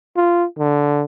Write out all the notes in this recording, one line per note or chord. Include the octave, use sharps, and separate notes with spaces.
F4
D3